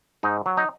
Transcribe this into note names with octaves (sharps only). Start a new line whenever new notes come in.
G#2 D#4
F#3
D#4